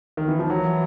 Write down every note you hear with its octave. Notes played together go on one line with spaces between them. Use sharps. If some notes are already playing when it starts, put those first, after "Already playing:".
D#3
E3
F3
E3 F#3